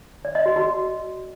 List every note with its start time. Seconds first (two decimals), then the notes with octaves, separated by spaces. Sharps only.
0.25 D5
0.35 D#5
0.46 F#4
0.56 F#4